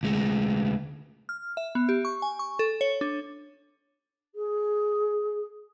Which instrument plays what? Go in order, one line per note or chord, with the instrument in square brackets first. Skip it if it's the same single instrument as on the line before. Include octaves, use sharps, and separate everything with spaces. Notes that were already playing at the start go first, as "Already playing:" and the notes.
[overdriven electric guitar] D2 G#3
[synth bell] F6
E5
B3
G4
C#6
G#5
C#6
A4
C#5
D4
[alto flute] G#4